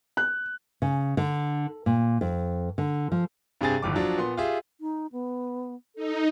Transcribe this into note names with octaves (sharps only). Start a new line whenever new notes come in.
F#6
C#3
D3
A#2
F2
D3
F3
G2 C3 G4 G#4 G#5 A6
D1 G1 D#2 D6
F3 F#3 D4
A#2 B3 C6
F4 G4 G#4 E5
D#4
B3
D#4 A4